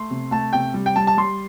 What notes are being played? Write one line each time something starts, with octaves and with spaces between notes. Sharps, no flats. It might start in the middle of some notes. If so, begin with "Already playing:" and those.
Already playing: A3 C6
C3
A3 A5
C3 G5
G3
G5
G3 A5
A5
G3 C6